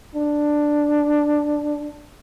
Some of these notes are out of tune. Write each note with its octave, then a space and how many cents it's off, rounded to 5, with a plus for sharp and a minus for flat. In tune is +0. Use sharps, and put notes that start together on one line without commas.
D4 +5